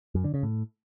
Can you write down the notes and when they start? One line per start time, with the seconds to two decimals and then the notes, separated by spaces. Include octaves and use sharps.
0.15 F#2
0.24 D3
0.34 C#3
0.43 A2